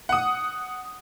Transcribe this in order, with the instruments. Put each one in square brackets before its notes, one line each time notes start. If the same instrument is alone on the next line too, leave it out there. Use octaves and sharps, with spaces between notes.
[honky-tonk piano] F#5 D#6